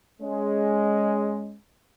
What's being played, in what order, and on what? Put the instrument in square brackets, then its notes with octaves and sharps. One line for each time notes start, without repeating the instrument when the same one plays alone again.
[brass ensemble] G#3 [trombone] C#4